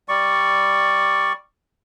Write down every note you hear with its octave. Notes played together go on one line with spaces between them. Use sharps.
G3 D5 C#6